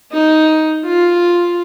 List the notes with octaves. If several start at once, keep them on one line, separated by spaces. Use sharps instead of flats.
D#4
F4